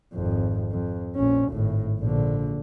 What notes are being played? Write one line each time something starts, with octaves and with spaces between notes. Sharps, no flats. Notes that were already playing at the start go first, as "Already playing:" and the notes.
G#1 F2
F2
A#1 C#4
G#1 A2
A#1 D3